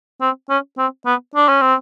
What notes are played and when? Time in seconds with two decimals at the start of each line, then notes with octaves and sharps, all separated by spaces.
0.21 C4
0.49 C#4
0.78 C4
1.06 B3
1.35 D4
1.48 C#4
1.61 C4